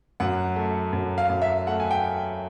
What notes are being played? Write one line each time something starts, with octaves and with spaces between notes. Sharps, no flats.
F#2 F#5
A3
F#2
F5
F#2
E5
A3 F#5
G#5
G5